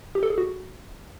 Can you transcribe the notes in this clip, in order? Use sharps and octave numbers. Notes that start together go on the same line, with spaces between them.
G4
A4
G#4
F#4